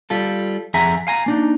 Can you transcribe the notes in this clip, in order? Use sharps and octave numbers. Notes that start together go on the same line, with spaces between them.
G3 F4 A4
F2 G#4 E5 F#5 G#5 A#5
F5 G#5 A#5
A#3 D4 D#4